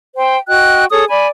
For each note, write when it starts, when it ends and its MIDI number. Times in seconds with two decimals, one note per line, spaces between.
0.17 0.38 72
0.17 0.38 79
0.48 0.85 66
0.48 0.85 75
0.48 0.85 79
0.48 0.85 90
0.91 1.04 68
0.91 1.04 69
0.91 1.04 73
0.91 1.04 87
1.09 1.28 74
1.09 1.28 80
1.09 1.28 83